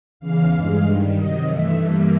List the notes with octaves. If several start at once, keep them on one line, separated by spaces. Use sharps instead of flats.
E2 C#3 E3 F5
G2 E3 G#3 F5
G2 D#3 G3
C3 D#3 F#3 D#5
G2 E3 A3 E5
G2 E3 G3 A#3 E5